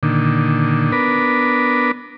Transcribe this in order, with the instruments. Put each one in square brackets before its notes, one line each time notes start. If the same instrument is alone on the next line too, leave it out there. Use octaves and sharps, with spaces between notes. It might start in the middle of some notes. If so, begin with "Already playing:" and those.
[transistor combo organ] A#2 D3 D#3
B3 D4 A#4 B4